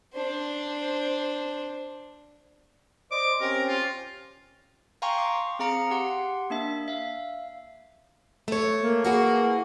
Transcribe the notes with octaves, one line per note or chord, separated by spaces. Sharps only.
D4 C5
C5 D5 D#5 D6
C4 C#4 G4 A#4
F4
F5 G5 G#5 A#5 C6 C#6
D6
C4 G#4 F5 A#5 C#7 D7
G4 F#5 C6
A#3 D4 E5
E5 F5
A3 C#5
A#3
E3 F#4 G#4